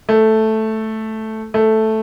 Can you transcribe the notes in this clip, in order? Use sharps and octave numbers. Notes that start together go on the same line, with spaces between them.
A3
A3